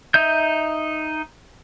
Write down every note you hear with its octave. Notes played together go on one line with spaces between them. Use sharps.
D#4 E5 G6